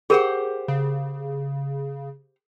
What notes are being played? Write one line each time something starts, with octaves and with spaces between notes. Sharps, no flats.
G4 G#4 A#4 C5 F#5
C#3